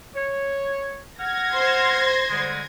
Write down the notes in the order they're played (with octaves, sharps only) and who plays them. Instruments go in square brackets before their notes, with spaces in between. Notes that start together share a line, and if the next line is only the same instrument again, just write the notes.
[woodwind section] C#5
[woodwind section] F#5 F6 [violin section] G#6 A#6
[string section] C5 C6
[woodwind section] D3 G3 G#3